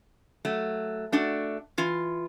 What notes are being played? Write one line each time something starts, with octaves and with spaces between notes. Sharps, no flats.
F#3 A3
A3 D4 F#4 D5
E3 F4